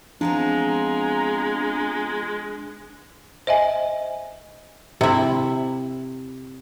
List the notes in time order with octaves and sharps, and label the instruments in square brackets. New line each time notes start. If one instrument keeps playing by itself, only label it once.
[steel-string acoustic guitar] F3 B3 C4 [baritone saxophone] G#3 [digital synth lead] D4 [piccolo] A#5
[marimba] C5 D#5 E5 G#5
[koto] C3 E4